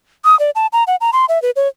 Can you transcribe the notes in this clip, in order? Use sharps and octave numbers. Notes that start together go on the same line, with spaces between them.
D#6
D5
A5
A#5
F#5
A#5
C6
E5
B4
C#5